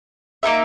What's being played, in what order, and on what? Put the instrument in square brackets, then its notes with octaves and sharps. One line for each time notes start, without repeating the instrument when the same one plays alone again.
[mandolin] A#3 D#4 A#4 E5